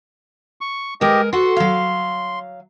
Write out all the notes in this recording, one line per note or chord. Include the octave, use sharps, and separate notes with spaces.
C#6
G#3 G4 A#4 D#5
F#4 A4 F#5 C6
F#3 F5